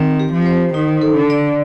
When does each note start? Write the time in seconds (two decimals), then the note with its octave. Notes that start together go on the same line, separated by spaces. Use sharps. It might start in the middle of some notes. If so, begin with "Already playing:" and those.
Already playing: D#3 C4
0.20 G4
0.33 F3
0.46 C5
0.74 D#3 D#4
1.01 A4
1.15 D3
1.30 D5